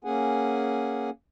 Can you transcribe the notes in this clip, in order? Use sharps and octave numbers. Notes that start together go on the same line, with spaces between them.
A#3 C#4 G#4 F#5 G#5